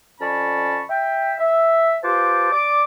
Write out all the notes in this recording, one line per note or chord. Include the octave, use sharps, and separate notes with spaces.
F2 C#4 D5 A5 B5 C#6
E5 G5
E5
F4 G4 B4 C5 A5 D6
D5 D6